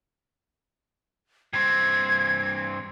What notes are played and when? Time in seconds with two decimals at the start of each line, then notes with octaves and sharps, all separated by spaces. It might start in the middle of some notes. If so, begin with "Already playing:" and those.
1.53 G2 C4 G#6